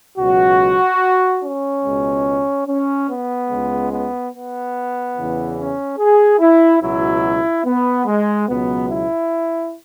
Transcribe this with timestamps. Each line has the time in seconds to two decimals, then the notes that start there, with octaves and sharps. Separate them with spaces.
0.18 C#2 B2 F#3 F#4
1.42 C#4
1.84 C#2 B2 G#3
2.67 C#4
3.08 B3
3.49 C#2 C#3 G#3
3.91 B3
4.33 B3
5.16 E2 C#3 E3
5.57 C#4
5.98 G#4
6.40 E4
6.81 C#2 B2 F#3 E4
7.65 B3
8.06 G#3
8.47 C#2 B2 F#3 B3
8.89 E4